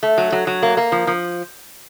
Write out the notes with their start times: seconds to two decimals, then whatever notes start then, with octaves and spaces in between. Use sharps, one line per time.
0.03 A3
0.18 F#3
0.32 F#3
0.47 F#3
0.63 A#3
0.77 A#3
0.92 F3
1.07 F3